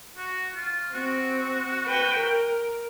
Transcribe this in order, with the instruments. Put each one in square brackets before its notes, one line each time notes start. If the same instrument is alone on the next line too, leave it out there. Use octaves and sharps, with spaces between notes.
[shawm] F#4
F4
[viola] C4 [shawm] F#4
[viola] B4 G5
A#4